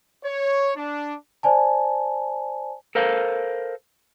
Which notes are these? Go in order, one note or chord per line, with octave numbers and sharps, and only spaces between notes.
C#5
D4
C5 D5 G#5 A5
A4 A#4 C5 F5